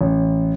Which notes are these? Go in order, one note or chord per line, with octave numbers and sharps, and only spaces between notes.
A1